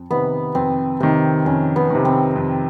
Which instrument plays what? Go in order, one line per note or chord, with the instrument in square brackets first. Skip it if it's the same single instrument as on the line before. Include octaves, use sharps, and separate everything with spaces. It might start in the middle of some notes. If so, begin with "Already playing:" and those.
Already playing: [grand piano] F2
[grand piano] C3 D#3 [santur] B3
[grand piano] F2 [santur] C4
[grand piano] C3 D#3 [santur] C4
[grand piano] F2 [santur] C#4
[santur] B3
[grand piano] C3 D#3
[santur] C4
[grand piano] F2